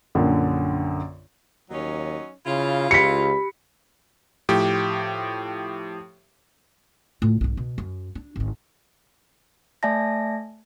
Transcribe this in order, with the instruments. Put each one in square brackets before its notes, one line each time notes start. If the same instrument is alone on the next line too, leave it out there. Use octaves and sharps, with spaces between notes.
[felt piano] A#1 F#2 D3
[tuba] D#2 [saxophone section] F#3 C#4 D#4
[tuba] C#3 [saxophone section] E4 F4
[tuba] C#2 [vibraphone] G4 B5 [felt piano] B6 C#7
[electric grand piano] A2 F3 G4
[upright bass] A2 F4
B1 G#2
B2
F#2
D4
G#1 D#3
[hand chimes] A3 D5 E5 G#5 A5 A#6